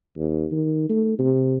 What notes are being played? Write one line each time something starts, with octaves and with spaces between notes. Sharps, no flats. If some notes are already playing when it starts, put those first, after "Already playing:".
D#2
D#3
A3
C3